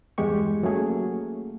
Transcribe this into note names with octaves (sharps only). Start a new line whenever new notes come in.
E2 G2 G#3 G4 C#6
F#3 A3 A#3 C#4 G#4